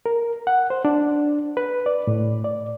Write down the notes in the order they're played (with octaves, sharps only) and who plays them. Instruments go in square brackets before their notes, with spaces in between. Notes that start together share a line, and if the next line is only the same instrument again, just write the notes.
[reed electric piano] A#4
F#5
C5
D4
B4
D5
A2
D5